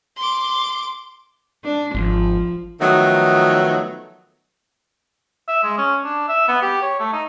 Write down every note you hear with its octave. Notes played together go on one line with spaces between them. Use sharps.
C6 D6
D4
G#1 F3
D#3 F3 F#3 A3 B3
E5
G#3
C#4
D4
E5
B3
G4
C#5
A3
D#4